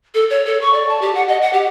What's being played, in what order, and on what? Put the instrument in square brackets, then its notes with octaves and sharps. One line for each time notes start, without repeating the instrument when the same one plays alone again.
[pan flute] A4
C#5
A4
C#6
D5
A5
G4
F#5
D#5
F#5
G4